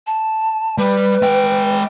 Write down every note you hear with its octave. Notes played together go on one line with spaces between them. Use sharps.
A5
G3 B4
G#3 G5